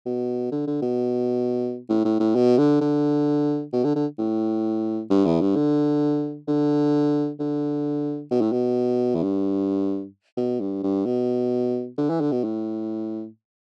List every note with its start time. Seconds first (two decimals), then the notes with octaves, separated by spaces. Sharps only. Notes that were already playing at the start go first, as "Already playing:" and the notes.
0.06 B2
0.52 D3
0.67 D3
0.82 B2
1.89 A2
2.05 A2
2.20 A2
2.35 B2
2.58 D3
2.81 D3
3.73 B2
3.84 D3
3.96 D3
4.19 A2
5.10 G2
5.26 E2
5.41 G2
5.56 D3
6.48 D3
7.40 D3
8.31 B2
8.41 A2
8.52 B2
9.15 E2
9.23 G2
10.37 B2
10.60 G2
10.83 G2
11.06 B2
11.98 D3
12.10 E3
12.21 D3
12.32 B2
12.44 A2